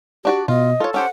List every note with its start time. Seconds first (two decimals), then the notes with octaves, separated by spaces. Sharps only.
0.25 D4 F#4 G4 D5
0.48 B2 F4 D#5
0.80 F4 A4 C#5
0.94 C#4 G4 C5 F#5